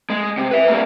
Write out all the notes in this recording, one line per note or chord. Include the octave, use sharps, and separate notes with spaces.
G#3
C3
B4 E5
G3 A#3